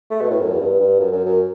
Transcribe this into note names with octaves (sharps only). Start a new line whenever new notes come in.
A3
B2
A2
F#2
E2
G2
G2
F#2
F#2
F#2